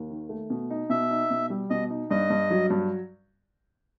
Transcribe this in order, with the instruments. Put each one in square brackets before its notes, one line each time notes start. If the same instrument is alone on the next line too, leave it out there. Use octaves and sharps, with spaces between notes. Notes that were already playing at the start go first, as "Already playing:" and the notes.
Already playing: [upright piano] D#2
D#3
A3
B2
D#4
[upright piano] B2 [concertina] E5
[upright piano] D#4
B2
G3
[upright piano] B2 [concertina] D#5
[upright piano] D#4
[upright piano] G2 [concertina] D#5
[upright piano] G2
F#3
G2